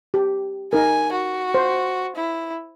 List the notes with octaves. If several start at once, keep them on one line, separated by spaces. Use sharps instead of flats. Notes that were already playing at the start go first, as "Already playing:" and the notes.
G4
D#4 A#4 G#5
F#4
C5
E4